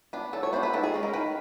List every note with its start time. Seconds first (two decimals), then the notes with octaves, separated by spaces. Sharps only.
0.13 B3 D4
0.33 F#3 A4
0.43 C#5
0.53 B3 D4 C5
0.63 B4
0.73 D#3 A4
0.84 G#4
0.94 G#3 C#4
1.03 A#4
1.13 D#3 B4